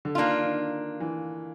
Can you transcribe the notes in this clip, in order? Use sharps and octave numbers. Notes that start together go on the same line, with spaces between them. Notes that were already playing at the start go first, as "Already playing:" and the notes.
D3
D#3 A#3 D4 F4
D#3
E3